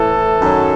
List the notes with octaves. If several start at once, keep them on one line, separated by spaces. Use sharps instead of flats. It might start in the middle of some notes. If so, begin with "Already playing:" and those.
Already playing: A2 E3 A4
F#2 D#3 F#3